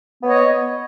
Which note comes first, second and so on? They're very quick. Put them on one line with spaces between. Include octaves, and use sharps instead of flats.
B3 C#5 D#5